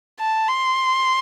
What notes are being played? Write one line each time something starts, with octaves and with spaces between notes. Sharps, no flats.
A5
C6